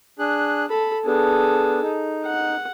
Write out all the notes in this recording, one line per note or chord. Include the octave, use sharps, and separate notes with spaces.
D4 G#4 F#6
A4 B5
B3 D4 G#4 A4
D#4
F#5